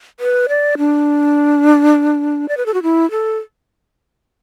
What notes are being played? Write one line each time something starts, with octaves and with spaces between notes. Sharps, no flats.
B4
D5
D4
D5
B4
A4
F#4
E4
A4